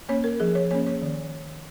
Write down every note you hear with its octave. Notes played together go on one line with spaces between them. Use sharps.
A#3 C#4 C#5
A#4
F3 G#4
C#5
A#3 C#4 C#5
C#5
D#3